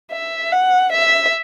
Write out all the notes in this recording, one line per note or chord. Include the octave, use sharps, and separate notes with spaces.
E5
F#5
E5